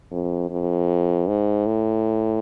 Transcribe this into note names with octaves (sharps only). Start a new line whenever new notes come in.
F2
F2
G#2
A2